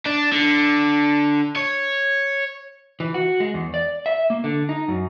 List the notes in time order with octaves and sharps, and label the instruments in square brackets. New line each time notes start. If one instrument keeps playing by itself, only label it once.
[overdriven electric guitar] D4
D3
C#5
[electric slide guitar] E3
F#4
G#3
E2
D5
E5
A#3
D3
D#4
F#2